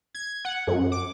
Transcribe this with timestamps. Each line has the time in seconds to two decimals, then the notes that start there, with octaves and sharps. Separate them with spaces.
0.15 G#6
0.45 F#5
0.67 F#2
0.92 D6